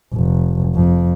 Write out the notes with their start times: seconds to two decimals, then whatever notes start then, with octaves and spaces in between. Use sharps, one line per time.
0.14 F1
0.75 F2